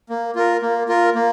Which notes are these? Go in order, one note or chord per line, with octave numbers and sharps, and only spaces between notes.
A#3
F4 A#4
A#3
F4 A#4
A#3